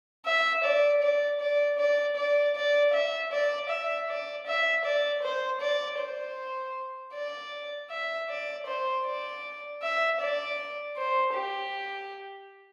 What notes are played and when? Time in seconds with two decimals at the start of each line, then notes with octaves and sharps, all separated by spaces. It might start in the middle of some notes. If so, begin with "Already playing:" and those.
0.25 E5
0.64 D5
1.02 D5
1.41 D5
1.79 D5
2.17 D5
2.56 D5
2.93 E5
3.32 D5
3.69 E5
4.08 D5
4.47 E5
4.85 D5
5.23 C5
5.61 D5
5.99 C5
7.14 D5
7.90 E5
8.29 D5
8.66 C5
9.06 D5
9.82 E5
10.20 D5
10.97 C5
11.34 G4